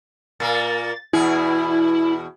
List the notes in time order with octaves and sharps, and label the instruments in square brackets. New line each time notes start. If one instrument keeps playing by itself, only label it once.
[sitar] A#2 A#3 [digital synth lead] A6
[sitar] E2 B2 G#4 [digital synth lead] E4